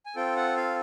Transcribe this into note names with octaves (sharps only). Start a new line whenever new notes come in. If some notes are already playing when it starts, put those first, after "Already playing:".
G#5
C4 F4 A4 G5
F#5
F5